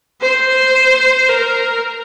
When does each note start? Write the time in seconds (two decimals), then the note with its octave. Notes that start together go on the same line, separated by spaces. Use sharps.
0.21 C5
1.29 A#4